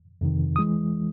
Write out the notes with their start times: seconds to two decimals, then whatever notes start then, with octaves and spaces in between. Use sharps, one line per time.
0.21 F2 C3 D#3
0.56 D#6
0.59 E3 G#3